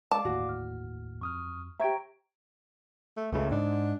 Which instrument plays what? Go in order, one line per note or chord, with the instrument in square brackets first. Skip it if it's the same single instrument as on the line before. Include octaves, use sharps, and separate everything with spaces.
[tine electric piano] G#3 [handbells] D5 F5 D6 [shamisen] A5
[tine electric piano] G1 D#2 A2 [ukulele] F#4
[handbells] F6
[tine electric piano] F2 [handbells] C#6 D#6 F6
[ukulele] G4 E5 [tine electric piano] C5 G5 G#6 [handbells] A#5 C#6 D7
[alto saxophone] A3
[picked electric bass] C#2 C#3 [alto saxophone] A3
[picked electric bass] G#2 [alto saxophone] D4